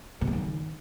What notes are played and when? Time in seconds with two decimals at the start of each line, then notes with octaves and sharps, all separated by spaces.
0.21 B2
0.27 C#3
0.33 D#3